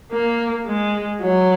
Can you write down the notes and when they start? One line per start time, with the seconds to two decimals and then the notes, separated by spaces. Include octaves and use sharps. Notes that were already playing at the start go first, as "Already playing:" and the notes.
0.12 A#3
0.66 G#3
1.21 F#3